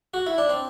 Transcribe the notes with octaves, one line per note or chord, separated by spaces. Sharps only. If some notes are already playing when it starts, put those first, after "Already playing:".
F#4
E4
D4
C4